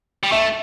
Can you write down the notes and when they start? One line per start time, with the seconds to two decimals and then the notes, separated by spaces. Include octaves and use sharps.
0.23 G3
0.32 A3 E5